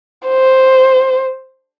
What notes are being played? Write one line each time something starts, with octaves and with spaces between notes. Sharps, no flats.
C5